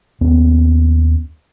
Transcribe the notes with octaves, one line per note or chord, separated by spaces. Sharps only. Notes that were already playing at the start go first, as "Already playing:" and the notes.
D#2 B3 C#4